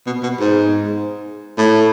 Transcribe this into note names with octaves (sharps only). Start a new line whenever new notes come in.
B2
B2
G#2
A2